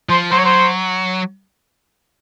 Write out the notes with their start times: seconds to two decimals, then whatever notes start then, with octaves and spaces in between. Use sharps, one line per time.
0.09 F3 C5
0.31 F#3 C5
0.38 C#5
0.45 C5